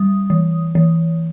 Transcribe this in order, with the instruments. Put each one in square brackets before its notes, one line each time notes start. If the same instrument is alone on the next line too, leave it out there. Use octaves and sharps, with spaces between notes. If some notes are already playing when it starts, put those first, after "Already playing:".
Already playing: [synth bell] G3 D#6
E3
E3